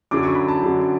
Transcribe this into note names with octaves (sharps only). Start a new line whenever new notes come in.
F#2 D3 F#3 D6
C#6
B5
A5
F#2 D3 F#3